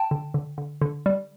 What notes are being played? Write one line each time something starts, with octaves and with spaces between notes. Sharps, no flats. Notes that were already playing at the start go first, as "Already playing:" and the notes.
Already playing: G5 A5
D3
D3
D3
D3
G3